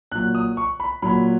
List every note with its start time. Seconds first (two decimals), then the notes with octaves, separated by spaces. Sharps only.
0.12 A#2 F#3 F#6
0.35 D#6
0.57 C#6
0.80 B5
1.02 A#2 F#3 B5